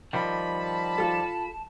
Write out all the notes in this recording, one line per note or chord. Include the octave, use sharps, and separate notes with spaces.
D#3 F3 G3 B5
A5
F4 A4